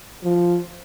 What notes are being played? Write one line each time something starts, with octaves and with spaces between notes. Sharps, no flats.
F3